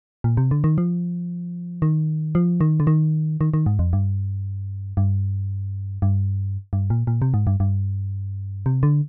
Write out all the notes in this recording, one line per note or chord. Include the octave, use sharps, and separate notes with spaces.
A#2
C3
D3
D#3
F3
D#3
F3
D#3
D3
D#3
D#3
D#3
G#2
F2
G2
G2
G2
G2
A#2
A#2
C3
G#2
G2
G2
C3
D3